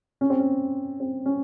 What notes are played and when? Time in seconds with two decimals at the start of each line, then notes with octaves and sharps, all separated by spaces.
0.21 C#4
0.30 C4
0.39 C#4
1.00 C4
1.26 C#4